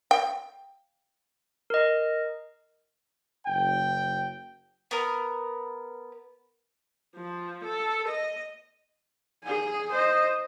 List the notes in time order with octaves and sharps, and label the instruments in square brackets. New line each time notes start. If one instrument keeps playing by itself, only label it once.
[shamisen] G5
[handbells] A#4 D#5
[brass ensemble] F#1 G5
[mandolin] B3 A#4
[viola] F3
A4
D#5
[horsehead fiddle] G#4 G#5
C5 D#5